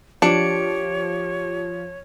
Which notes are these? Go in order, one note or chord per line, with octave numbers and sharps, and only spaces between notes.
F3 D4 G4 C#5 C#7 D7